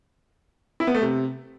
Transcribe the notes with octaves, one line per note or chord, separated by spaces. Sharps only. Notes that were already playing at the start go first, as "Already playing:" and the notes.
E4
B3
A3
C3